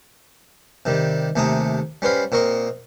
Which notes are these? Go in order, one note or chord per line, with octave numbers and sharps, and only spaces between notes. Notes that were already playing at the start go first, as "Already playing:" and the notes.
C3 D#3 G3
D#2 C3 A3 G#4 A#5 D#6
G3 C#4 B4 C5 F5
A#2 C4 A#4 D#5 C#6